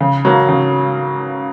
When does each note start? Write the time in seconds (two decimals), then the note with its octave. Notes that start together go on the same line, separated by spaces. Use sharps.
0.01 C#3
0.25 F#3 A#3
0.49 C#3